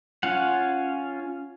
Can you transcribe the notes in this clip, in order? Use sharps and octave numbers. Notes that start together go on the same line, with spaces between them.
C#4 F4 F#5